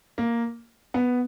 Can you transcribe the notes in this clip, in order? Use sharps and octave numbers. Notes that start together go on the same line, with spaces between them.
A#3
B3